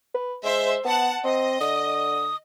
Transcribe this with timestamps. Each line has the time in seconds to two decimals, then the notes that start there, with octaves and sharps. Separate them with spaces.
0.14 B4
0.44 G#3 C5 E5
0.85 B3 F#5 A5
1.24 C4 D#5
1.61 D3 D#6